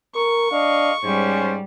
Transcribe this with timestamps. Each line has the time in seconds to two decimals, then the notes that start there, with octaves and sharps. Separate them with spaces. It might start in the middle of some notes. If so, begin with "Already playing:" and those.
0.15 A#4 C#6
0.52 D4 D#5 F5
1.04 G#2 G3 C#4 C5